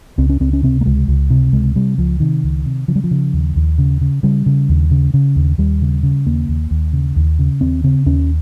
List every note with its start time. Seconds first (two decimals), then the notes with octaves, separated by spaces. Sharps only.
0.18 C#2 C4
0.29 C#4
0.40 C#2 C4
0.53 C#4
0.63 C3 C4
0.81 A#3
0.86 C#2 G#3
1.08 C#2
1.30 C3
1.53 C#2 G#3
1.76 C3 G3
1.98 C#2 F3
2.20 C3 D#3
2.43 C#2
2.66 C3
2.88 C#3 F3
2.96 G3
3.04 F3
3.11 C#3
3.33 D#2
3.56 D#2
3.78 C#3
4.01 C#3
4.23 C#3 G3
4.46 C#3
4.69 D#2
4.91 C#3
5.14 C#3
5.36 D#2
5.58 D#2 G3
5.82 C#3
6.03 C#3
6.26 D#2 A#3
6.48 D#2
6.71 D#2
6.93 C#3
7.16 D#2
7.39 C#3
7.61 D#2 C4
7.84 C#3 C4
8.06 D#2 C#4